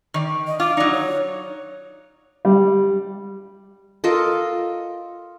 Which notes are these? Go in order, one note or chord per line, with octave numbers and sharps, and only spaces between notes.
D#3 D5
D#5
F4 D6
F#3 D#4 D5
C#5
G3
F4 A4 A#4 D#5